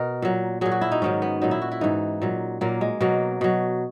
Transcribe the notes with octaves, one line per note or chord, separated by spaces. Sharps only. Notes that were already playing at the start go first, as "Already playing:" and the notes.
Already playing: B2 A#4
A#2 F#3
A#2 F#3 G#4
F#4
E4
D#4
G#2 D#3 F#3 C#4
B3
A#2 F#3 D#4
E4
F#4
E4
G#2 E3 D#4
A#2 F#3
A#2 F#3 A#3
G#3
B2 F#3 A#3
B2 F#3